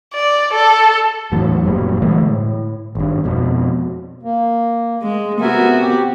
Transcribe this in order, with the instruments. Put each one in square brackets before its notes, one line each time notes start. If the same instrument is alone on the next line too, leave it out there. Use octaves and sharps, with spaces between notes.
[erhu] D5
A4
[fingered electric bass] E2 A2 F#3
F#1 A#2 F#3 G3
D3 E3 G#3 A3
A2
G#1 G2
F2 B2
[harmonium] A#3
[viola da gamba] G#3
[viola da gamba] C3 B3 F#4 [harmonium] A#4 E5 G#5
[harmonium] G4